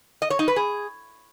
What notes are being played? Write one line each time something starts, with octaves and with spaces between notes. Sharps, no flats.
D#5
C#5
D#4
B4
G#4